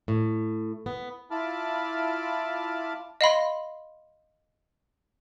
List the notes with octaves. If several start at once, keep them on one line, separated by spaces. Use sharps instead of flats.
A2
B3
E4 F4 A5 B5 D6 F6
D#5 F5 B5 C6